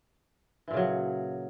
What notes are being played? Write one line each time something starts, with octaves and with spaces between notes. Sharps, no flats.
A#2 C#3 E3 F#3